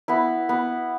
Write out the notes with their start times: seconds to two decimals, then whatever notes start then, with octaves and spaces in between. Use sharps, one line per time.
0.08 B3 E4
0.49 B3